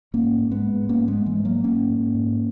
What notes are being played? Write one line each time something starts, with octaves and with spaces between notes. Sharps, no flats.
G#2 A#3 C#4
G#2
G#3 B3
G#2
G#2 A#3 C#4
G#3 B3
G#2
E3 G#3
G#2
F#3 A#3
G#2 A#3 C#4
G#2
G#2